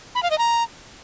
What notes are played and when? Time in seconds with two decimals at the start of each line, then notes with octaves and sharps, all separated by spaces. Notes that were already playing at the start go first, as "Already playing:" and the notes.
0.15 B5
0.23 F5
0.30 D#5
0.38 A#5